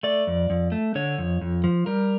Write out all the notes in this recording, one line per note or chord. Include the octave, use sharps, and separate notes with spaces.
A3 D5
F2
F2
A3
D3 C#5
F2
F2
F3
G3 A#4